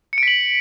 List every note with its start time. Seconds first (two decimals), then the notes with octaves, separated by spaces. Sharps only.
0.13 C#7
0.18 D7
0.23 B6
0.28 F#7